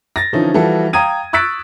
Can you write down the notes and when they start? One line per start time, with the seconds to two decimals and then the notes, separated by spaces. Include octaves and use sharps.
0.16 A6 A#6
0.33 D3 E3 F3 C#4 D#4
0.54 E3 F3 G3 F#4 A4
0.93 F5 G5 A#5 D#6 G#6 D#7
1.33 C#6 E6 F#6 A6 B6 D7